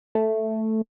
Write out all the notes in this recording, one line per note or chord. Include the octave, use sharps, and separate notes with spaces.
A3